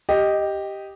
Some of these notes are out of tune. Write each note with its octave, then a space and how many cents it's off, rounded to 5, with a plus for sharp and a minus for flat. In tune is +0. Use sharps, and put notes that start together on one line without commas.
G4 +0 D#5 +0